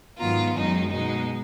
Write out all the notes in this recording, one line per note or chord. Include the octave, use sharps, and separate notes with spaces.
G#2 D#3 F#3 B3 F4 A#5
F#2 D#3 G#3 D#4
B2 G#3 D#4